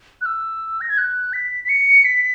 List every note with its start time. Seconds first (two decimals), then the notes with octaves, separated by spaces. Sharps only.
0.21 F#6
0.26 E6
0.81 A#6
0.89 G#6
0.98 F#6
1.33 B6
1.64 B6
1.69 C#7
2.04 B6